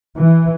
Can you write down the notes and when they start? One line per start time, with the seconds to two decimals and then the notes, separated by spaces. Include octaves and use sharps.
0.17 E3